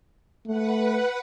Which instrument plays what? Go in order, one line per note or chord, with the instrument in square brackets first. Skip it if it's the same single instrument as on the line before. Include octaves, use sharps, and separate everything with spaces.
[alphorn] A3 [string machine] B4 F#5